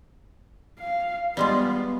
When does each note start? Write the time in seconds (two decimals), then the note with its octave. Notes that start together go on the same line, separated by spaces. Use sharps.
0.79 F5
1.37 G3 G#3 B3 F4